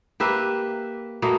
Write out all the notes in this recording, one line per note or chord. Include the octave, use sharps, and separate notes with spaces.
A#3 G4 B4 E5
B2 A3 A#3